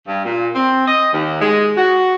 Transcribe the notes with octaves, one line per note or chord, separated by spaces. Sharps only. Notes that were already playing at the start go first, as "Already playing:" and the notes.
G2
A#2
C4
D#5
D#2
G#3
F#4